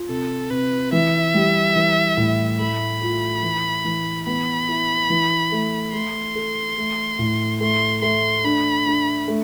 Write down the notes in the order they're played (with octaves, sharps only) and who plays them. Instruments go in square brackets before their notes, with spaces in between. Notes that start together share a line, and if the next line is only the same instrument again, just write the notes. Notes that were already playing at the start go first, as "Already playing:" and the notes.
Already playing: [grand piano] F4
[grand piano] C3 [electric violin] A4
[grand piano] C3 [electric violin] B4
[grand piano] E3 [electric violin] E5
[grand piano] G3
E3
A2
[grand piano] A3 [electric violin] B5
[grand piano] F4
E3
E3
[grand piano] B3 [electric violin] B5
[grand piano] E4
E3
A3
[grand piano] A3 [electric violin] C6
[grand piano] A4
A3
A2
[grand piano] A3 [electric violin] C6
[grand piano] A3 [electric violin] C6
[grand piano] D4 [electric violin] B5
[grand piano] D4
A3